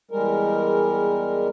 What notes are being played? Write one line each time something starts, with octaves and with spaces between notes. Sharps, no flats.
E2 G3 G#3 A#4